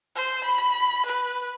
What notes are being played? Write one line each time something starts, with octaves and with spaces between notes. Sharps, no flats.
C5
B5
B4